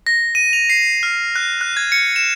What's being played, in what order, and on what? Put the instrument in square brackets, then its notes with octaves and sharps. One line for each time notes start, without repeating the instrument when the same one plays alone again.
[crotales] A#6
D#7
F7
C7
F6
F#6
F#6
G#6
C#7
E7